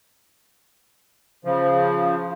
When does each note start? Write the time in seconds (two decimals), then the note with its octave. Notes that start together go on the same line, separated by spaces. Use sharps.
1.45 C#3 F3